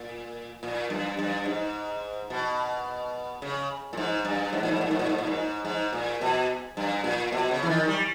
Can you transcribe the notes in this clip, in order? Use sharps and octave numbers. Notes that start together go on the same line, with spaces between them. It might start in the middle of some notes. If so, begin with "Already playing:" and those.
Already playing: A#2
A#2
G2
G2
G#2
B2
C#3
A#2
G#2
G2
G#2
A#2
G#2
A#2
G#2
A#2
G#2
A#2
G#2
G#2
A#2
B2
G2
A#2
B2
C#3
E3
D#3
G3